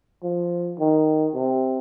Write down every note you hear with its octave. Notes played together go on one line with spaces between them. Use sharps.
F3
D#3
C3